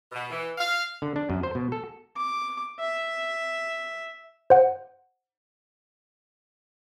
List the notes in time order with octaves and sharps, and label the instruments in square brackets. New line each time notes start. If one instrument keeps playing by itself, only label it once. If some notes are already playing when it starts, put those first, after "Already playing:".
[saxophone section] B2
E3
F5
[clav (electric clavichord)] D3
D4
F#2
C5
B2
A4
[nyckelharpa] D6
E5
[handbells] C5 F#5